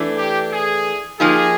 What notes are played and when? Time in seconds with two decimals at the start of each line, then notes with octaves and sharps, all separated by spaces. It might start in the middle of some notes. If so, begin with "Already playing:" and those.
Already playing: E3 A3 D4
0.17 G4
0.51 G#4
1.20 F3 A#3 D#4 G4 G#4